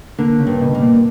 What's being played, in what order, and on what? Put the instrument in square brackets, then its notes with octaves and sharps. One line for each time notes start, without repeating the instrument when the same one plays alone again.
[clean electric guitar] D3 [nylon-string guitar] A#3
[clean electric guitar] C#3
[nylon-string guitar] G2
[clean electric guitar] B2
[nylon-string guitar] A#3
[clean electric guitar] A#2